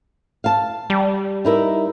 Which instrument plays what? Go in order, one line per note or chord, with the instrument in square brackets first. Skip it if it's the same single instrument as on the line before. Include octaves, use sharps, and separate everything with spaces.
[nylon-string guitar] F5 A5
[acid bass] G3
[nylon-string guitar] D#4 E4 A#4